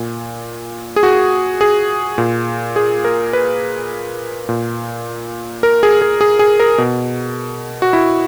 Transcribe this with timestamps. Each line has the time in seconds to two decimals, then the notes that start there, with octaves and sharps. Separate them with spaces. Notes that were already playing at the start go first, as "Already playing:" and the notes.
Already playing: A#2
0.96 G#4
1.03 F#4
1.61 G#4
2.18 A#2
2.76 G#4
3.04 A#4
3.33 B4
4.49 A#2
5.63 A#4
5.83 G#4
6.02 G#4
6.21 G#4
6.39 G#4
6.60 A#4
6.78 B2
7.82 F#4
7.93 E4